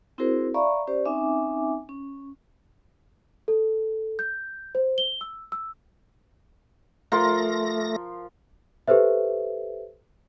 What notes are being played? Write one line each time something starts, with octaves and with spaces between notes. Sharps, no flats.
C4 E4 F#4 G#4 A#4 C5
D5 E5 F5 A#5 B5 C#6
C#4 G4 C5 D5
C4 C#4 D#4 E5 G#5 D6
C#4
A4
G6
C5
G7
E6
E6
F3 A3 A#4 C6 A#6
G4 A4 B4 C5 E5